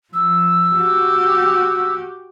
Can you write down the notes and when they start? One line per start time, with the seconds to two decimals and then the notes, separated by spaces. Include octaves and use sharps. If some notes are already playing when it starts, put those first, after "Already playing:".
0.13 F3 E6
0.75 F#4 G4